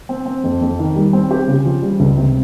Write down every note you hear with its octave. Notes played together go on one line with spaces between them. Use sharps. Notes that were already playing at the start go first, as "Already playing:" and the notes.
C4
C4
F2
F2
D#3
G3
C4
G4
C#3
F3
G3
C#2
C3